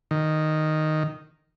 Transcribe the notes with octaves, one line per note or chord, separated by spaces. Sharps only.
D#3